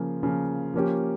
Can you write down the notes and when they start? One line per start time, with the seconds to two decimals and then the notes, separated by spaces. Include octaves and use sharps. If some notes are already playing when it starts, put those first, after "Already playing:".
Already playing: C#3 F3 A#3
0.23 C#3 F3 A#3
0.74 F3 A#3 C#4 G4